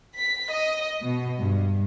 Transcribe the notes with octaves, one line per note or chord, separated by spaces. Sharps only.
B6
D#5
B2
G2